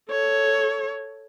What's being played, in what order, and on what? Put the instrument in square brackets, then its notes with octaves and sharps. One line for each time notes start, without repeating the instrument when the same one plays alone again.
[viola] A4 C#5